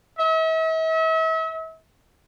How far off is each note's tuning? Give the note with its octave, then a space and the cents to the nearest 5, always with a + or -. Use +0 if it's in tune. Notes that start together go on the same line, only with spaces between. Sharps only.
E5 -40